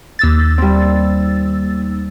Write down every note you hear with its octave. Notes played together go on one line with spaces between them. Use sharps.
D#2 E6 A6
G3 C4